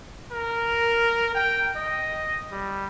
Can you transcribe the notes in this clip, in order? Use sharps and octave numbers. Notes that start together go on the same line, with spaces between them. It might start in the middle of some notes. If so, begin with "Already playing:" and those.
A#4
G5
D#5
G3